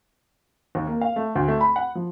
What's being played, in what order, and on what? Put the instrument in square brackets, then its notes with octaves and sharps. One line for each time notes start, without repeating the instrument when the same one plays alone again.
[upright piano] D#2
A#3
F5
A3
D2
A3
B5
F#5
F3